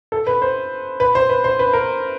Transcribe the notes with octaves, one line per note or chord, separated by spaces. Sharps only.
A4
B4
C5
B4
C5
B4
C5
B4
A#4